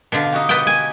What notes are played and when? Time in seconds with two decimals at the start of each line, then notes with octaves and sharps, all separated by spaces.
0.12 B2 D3 F5 G#5
0.32 D#4 F#4 G4
0.49 B3 G5
0.67 G#5